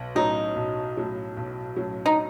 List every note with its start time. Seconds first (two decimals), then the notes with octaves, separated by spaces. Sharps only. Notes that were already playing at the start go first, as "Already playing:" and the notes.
Already playing: B1
0.15 A2 F#3 C#4 D#4
0.56 B1
0.97 A2 F#3 C#4
1.37 B1
1.76 A2 F#3 C#4
2.06 D#4